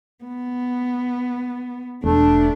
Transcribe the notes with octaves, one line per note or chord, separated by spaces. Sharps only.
B3
E1 A3 D4